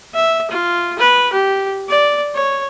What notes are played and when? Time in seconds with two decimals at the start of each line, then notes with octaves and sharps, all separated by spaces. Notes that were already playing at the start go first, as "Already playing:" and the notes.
0.14 E5
0.50 F4
0.98 B4
1.32 G4
1.89 D5
2.35 C#5